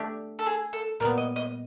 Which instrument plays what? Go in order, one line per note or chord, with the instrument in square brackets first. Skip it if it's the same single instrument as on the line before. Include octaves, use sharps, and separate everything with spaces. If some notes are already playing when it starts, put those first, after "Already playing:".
Already playing: [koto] A3 D4 G4
[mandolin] A4
G#4
A4
[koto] A#2 G3 B3 [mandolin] A#4
[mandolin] D#5
D#5